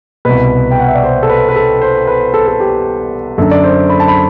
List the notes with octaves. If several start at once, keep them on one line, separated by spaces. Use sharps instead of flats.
C2 B2 B4
G5
F#5
E5
D5
C5
A4
B4
B4
A4
C5
B4
A4
A4
G4
F#2 D3 A4
D5
C5
B5
A5
B5